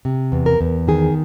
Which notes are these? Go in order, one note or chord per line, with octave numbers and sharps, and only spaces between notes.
C3
E2
A#4
E2
D#3 G#4